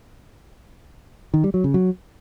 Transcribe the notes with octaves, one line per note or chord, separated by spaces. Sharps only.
D#3
G3
F#3
C#3
F#3